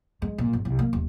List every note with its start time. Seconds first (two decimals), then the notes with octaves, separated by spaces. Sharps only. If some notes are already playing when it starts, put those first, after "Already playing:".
0.22 G#3
0.38 A#2
0.53 G1
0.65 C2
0.79 A#3
0.93 D#1